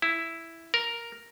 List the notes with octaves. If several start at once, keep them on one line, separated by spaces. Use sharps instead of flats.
E4
A#4